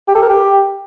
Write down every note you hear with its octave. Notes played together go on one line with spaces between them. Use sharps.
G4
A4
A#4
G4